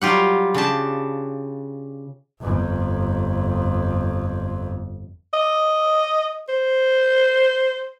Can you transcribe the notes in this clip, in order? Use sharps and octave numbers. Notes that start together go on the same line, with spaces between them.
F#3 G3 F4 G4 F#5
C#3 D4 G4 A5
G1 F2
D#5
C5